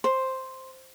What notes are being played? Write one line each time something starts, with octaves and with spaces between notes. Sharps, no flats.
C5